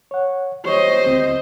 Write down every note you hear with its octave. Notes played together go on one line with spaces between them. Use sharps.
C#5 F#5
G4 C5 C#5 D#5 C#6
D2 C4